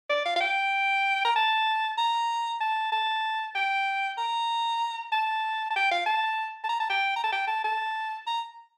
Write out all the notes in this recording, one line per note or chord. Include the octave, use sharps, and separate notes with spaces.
D5
F5
F5
G5
A#5
A5
A#5
A5
A5
G5
A#5
A5
A5
G5
F5
A5
A5
A#5
A5
G5
A#5
A5
G5
A5
A5
A#5